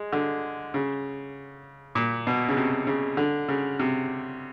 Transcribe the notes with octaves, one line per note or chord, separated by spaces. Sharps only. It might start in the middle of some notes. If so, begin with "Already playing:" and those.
Already playing: G#3
D3
C#3
A#2
B2
C#3
C3
C#3
D3
C#3
C3